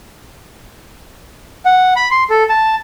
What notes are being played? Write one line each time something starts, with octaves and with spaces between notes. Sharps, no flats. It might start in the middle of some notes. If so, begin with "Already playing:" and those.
F#5
B5
C6
A4
A5